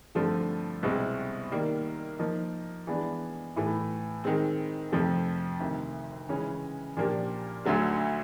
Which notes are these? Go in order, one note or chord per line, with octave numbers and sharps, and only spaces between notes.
G2 D3 F3 A3 C4
C2 B2 G#3 C4
D#3 G3 A#3
F3 A#3 D#4
E3 G#3 B3 D4
A2 E3 A3
D#3 G#3 C4
F2 C3 F3 A3
D2 C3 D#3
C#3 E3 G#3 C#4
A#2 F3 A#3 D4 G4
D2 D3 F#3 A3 D4